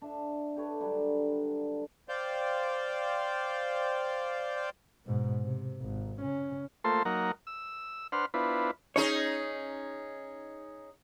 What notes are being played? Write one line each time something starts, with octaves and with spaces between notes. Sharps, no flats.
D4 E5 C#6
G4 A4 B4 C#5
D3 F#3 G3 D4
C5 D5 F5 G5
G#2 B2
C3
G#1
C#3 C#4
A3 A#3 F4 A4 C5 C6
F#3 A#3 D#4 A#4 F#5
E6
D4 B4 C5 F#5 C6 F6
B3 D4 E4 F4 B4 C5
C#4 D#4 G#4 C#5